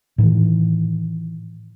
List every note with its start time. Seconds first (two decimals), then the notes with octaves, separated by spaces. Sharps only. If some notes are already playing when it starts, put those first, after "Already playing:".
0.18 A2 D#3 E3